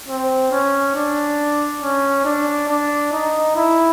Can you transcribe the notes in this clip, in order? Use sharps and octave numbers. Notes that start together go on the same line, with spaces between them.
C4
C#4
D4
C#4
D4
D4
D#4
E4